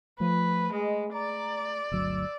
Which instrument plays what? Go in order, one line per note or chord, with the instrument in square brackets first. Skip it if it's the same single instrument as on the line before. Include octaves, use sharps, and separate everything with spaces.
[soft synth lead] F3 [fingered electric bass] A3 [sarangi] B4
[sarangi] G#3 [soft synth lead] D#5
[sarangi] D5 [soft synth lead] A#5
[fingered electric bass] G1 D2 F#3 [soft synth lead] E6